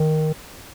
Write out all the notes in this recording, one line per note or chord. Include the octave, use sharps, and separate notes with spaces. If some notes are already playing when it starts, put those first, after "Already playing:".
Already playing: D#3